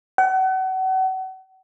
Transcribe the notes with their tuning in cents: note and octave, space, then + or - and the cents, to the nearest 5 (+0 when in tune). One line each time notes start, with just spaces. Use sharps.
F#5 +35